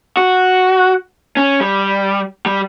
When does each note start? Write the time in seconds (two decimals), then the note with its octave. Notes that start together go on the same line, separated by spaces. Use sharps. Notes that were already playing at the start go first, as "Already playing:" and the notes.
0.17 F#4
1.37 C#4
1.61 G3
2.46 G3